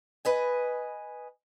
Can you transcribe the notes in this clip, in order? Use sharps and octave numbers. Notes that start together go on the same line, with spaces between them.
B4 D#5 G#5